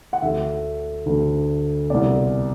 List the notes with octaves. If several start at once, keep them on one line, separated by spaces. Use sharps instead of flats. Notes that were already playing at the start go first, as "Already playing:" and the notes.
F#5
D2 D3 E5
D2 D3
C2 B2 D5